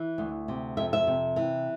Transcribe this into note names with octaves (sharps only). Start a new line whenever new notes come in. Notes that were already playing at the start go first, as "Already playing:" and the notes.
Already playing: E3
D2
C3
F2 E5
E5
C3
E3